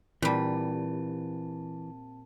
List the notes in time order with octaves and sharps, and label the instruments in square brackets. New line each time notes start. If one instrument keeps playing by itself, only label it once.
[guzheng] A#2 G3 [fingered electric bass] E3 [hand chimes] C4 A5